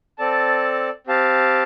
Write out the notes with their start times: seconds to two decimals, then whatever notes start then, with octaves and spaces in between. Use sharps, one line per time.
0.18 C4 A4 D5 A5
1.07 C4 G4 F5 A5